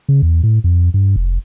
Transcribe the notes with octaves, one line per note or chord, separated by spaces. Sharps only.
C#3
E2
A2
F2
G2
F1